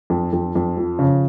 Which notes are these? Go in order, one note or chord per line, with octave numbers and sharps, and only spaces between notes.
F2
F2
F2
F3
C#3